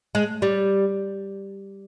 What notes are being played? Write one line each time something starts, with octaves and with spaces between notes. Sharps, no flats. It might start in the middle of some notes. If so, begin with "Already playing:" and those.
G#3
G3